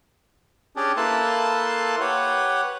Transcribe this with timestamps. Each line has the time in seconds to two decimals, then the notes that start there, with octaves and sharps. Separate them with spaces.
0.76 C#4 D4 G4 G#4 D5
0.97 A#3 E4 A4 B4 A5 C6
2.00 G4 B4 C#5 F#5